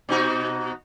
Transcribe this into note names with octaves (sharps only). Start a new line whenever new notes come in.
B2 D#4 F#4